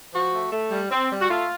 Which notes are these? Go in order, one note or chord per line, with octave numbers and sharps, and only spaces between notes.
F3 F#4
A3
A3
G3
C4
G3
F#4
A3 F4